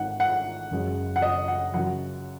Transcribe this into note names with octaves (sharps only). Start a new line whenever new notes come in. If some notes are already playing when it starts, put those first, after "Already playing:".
Already playing: G#1 G#2 D#3 F#5
F#5
F#1 F#2 C#3 G#3
F#5
D#5
F#5
F#2 C#3 F#3 F#5